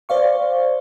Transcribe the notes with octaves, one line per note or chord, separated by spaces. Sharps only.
C5 D5 F5 C#6